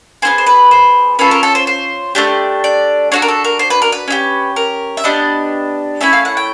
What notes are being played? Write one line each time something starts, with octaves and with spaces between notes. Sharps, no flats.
B3 E4 G#4 C5
C5
B4
C5
C#4 F4 A4 B4
A#4
A4
C5
C5
A3 D4 G4
D5
D4 F#4 A4 C#5
A#4
A4
A#4
C5
B4
A#4
B4
C#4 E4 G4
A#4
E5
B3 D4 G4 D#5
A3 C#4 E4 E5
F5
F#5
G5